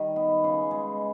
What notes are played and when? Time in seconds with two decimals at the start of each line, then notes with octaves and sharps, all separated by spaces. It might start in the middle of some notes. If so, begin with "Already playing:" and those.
Already playing: D#3 G3
0.16 B3
0.44 C#3
0.71 G#3